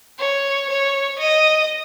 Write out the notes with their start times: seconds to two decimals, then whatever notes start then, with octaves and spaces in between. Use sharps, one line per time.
0.19 C#5
0.70 C#5
1.19 D#5